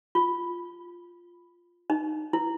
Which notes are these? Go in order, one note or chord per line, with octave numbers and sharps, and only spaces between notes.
F4
D#4
E4